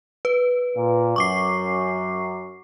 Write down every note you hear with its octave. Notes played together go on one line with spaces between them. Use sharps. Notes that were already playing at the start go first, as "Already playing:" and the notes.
B4
A#2
F#2 C#6 D6 C7